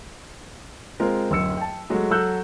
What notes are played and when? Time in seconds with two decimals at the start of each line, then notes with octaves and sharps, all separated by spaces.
1.00 G#3 C4 F4 A#4
1.31 D1 F#2 E6 C#7
1.57 G5 A5
1.90 F#3 G#3 A3 F#4
2.10 F#3 F#4 A4 E6 F#6 G6